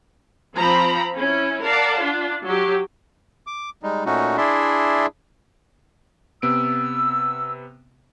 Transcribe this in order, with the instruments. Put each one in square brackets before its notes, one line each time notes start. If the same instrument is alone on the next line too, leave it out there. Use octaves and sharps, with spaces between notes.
[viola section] F3 C4 A#5 B5
C#4 E4
A#4 D5 F5 F#5 A5
D4 F4
F#3 G4
[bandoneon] D6
G3 G#3 D#4
A#2 A3 C#4 D#4 F#4
D4 E4 G#4 D5 E5 C6
[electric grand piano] C3 B3 D7 [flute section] E6